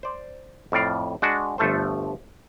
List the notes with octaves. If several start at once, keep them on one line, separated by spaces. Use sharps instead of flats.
C5 D5
F2 A2 D5 F5
G#3 D4 F#4
G1 F3 A3 A4 C5